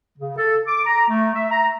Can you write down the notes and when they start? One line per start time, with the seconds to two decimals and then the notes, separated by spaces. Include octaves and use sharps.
0.18 C#3
0.37 A4
0.67 D6
0.86 A#5
1.09 A3
1.35 E5
1.50 A#5